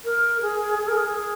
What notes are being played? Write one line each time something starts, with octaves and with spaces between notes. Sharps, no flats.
A#4
G#4
G#4
A#4
G#4